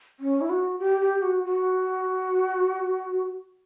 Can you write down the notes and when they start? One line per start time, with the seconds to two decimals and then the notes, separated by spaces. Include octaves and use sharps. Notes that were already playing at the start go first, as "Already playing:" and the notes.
0.20 C#4
0.41 E4
0.50 F#4
0.79 G4
1.01 G4
1.22 F#4
1.45 F#4